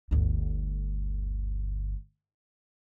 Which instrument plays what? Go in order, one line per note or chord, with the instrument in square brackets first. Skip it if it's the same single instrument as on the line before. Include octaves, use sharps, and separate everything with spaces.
[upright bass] G1 D2